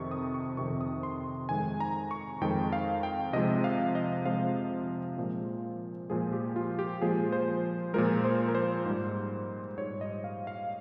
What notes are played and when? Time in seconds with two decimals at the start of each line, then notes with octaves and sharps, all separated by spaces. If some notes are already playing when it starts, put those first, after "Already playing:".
Already playing: F2 C3 D#3 C#6
0.11 D#6
0.34 C#6
0.57 F2 C3 D#3 C#6
0.81 D#6
1.03 C6
1.49 F2 D#3 G#3 G#5
1.80 A#5
2.11 C#6
2.41 F2 D#3 G#3 G5
2.73 F5
3.03 G5
3.33 C3 F3 G#3 D#5
3.64 F5
3.95 D#5
4.25 C3 F3 G#3 F5
5.18 A#2 F3 G#3
6.10 A#2 F3 G#3 G#4
6.32 G4
6.56 F4
6.79 G4
7.02 A#2 F3 G#3 G#4
7.32 C5
7.93 A#2 F3 G#3 A#4
8.25 C5
8.48 A#4
8.55 C5
8.85 G#2 G3
9.78 G#2 G3 C#5
10.01 D#5
10.24 F5
10.47 F5